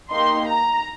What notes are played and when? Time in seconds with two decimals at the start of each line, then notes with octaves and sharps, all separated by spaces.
0.11 A#3 D#4 G4 C6
0.47 A#5